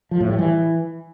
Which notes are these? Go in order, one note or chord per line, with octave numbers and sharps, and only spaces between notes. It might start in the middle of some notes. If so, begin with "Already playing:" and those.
F3
A2
G3
E3